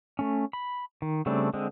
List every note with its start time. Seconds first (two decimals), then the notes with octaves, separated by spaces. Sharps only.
0.19 A3 C#4
0.53 B5
1.02 D#3
1.26 C#3 G3 A3 C4 D4
1.54 D3 G#3 C4